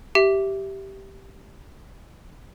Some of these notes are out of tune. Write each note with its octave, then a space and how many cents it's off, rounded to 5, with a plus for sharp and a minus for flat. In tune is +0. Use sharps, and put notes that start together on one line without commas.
G4 -10 E5 +0